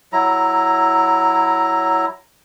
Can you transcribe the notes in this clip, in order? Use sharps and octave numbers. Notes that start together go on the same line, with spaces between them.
F#3 E4 A#5